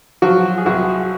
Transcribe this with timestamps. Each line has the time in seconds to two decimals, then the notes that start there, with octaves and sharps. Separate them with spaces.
0.22 F3 F#3 F#4
0.58 G#4
0.65 C2 F#3 F#4